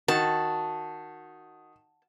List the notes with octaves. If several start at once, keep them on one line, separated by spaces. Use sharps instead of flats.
D#3 F#4 A5